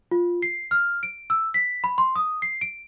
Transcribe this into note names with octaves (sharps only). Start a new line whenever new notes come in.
F4
C7
F6
D7
E6
B6
B5
C6
D#6
C7
D7